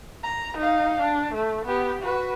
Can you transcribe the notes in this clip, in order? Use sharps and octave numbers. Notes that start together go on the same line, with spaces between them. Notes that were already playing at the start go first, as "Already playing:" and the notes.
A#5
D#4 F5
D4
A3
B3 G4
F#4 B4